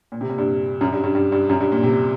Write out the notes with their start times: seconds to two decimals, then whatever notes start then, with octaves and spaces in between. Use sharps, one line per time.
0.12 A#2
0.21 C3
0.29 A#2
0.38 G2
0.81 F#2
0.93 G2
1.04 G2
1.15 G2
1.32 G2
1.49 F#2
1.60 G2
1.72 A#2
1.83 C3